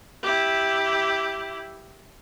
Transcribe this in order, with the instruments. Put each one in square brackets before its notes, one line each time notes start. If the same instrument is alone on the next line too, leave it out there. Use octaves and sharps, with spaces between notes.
[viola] E4 G4